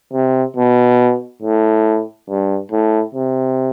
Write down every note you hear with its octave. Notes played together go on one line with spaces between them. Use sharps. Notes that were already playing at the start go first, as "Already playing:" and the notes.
C3
B2
A2
G2
A2
C3